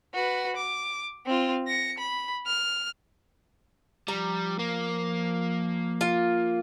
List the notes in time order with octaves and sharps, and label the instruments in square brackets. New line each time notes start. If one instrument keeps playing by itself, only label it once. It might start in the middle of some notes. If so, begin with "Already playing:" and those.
[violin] F#4 B4
D6
C4 F4
A#6 C#7
B5
F6
[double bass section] F3 [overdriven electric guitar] G3 [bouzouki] A#5
[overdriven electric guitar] A#3
[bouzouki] F4